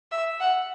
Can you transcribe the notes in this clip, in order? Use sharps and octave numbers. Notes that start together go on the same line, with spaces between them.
E5
F#5